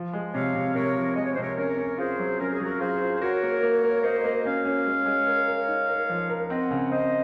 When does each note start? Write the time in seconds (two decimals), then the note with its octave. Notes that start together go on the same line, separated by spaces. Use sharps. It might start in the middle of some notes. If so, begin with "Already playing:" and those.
Already playing: F3
0.13 G#3
0.34 C3 C#5 F5
0.55 C3
0.75 C3 A#4 C#5
0.96 F3
1.16 G#3 D#5
1.25 C#5
1.33 C5
1.37 C3 A#4 C#5
1.57 C#4 A#4 C#5
1.78 C#4
1.98 F4 G#4 C5
2.19 F#3
2.40 C#4 A#4
2.52 G#4
2.60 F#3 F#4 A#4
2.80 F4 G#4 C5
3.01 F4
3.15 C5
3.21 F#4 A#4 C#5
3.42 A#3
3.63 A#3
3.83 A#3
4.04 A#3 C5 D#5
4.24 A#3
4.45 C#4 C#5 F5
4.65 C#4
4.86 G#3
5.06 G#3
5.27 A#4
5.48 A#4
5.68 D#4
5.89 A#4
6.09 F3
6.29 A#4
6.50 C4 D#5 F#5
6.71 C#3
6.91 C4 C5 D#5